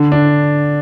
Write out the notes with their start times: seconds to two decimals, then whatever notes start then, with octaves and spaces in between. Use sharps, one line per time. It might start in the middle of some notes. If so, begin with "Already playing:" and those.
Already playing: D3
0.12 D4